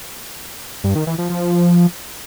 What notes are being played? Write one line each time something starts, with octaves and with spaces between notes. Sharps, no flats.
G2
D#3
E3
F3
F3